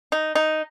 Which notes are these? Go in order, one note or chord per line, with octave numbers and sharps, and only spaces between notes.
D#4
D#4